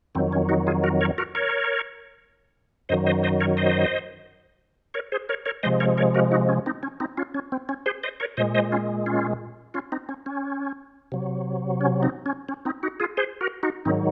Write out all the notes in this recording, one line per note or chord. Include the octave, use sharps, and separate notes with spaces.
F2 D#3 F#3 C4
C#4
D#4 F#4
F4 G#4
F#4 A#4
A#4 C#5
F#4 A#4
A#4 C#5
F#2 D#3 F#3 C5 D#5
C5 D#5
C5 D#5
A#4 C#5
C5 D#5
A#4 C#5
G#4 C5
A#4 C#5
A#4 C#5
C3 F3 G#3 C5 D#5
A#4 C#5
A#4 C#5
F#4 A#4
D#4 F#4
C#4
C4 D#4
C#4
C4 D#4
C#4 F4
C#4
C4
C#4
G#4 C5
C5 D#5
A#4 C#5
A#2 G#3 C5 D#5
C5 D#5
C#4 F4
C#4 F4
C#4 F4
C4 D#4
C#4
C#4
C3 F#3
C#4
C4 D#4
C#4
C#4
C4 D#4
D#4 F#4
F4 G#4
G#4 C5
F#4 A#4
D#4 F#4
G#2 D#3 F#3 C4 D#4